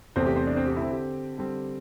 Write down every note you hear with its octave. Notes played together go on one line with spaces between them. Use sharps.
E2 C3 A3 C4 C5
G4
C4 C5
D4 D5
C4 C5
G4
D3 E4
C4
G4
D3 G3 C4